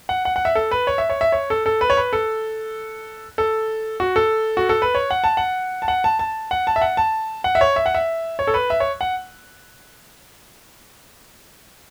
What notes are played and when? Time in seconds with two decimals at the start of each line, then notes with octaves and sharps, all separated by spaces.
0.09 F#5
0.25 F#5
0.36 F#5
0.45 E5
0.55 A4
0.71 B4
0.87 C#5
0.98 E5
1.09 C#5
1.21 E5
1.32 C#5
1.50 A4
1.66 A4
1.81 B4
1.90 C#5
1.97 B4
2.13 A4
3.38 A4
4.00 F#4
4.16 A4
4.57 F#4
4.69 A4
4.82 B4
4.95 C#5
5.11 F#5
5.24 A5
5.37 F#5
5.82 A5
5.88 F#5
6.04 A5
6.19 A5
6.51 F#5
6.67 A5
6.76 E5
6.82 F#5
6.97 A5
7.44 F#5
7.55 E5
7.61 C#5
7.76 E5
7.86 F#5
7.95 E5
8.39 C#5
8.47 A4
8.54 B4
8.70 E5
8.80 C#5
9.01 F#5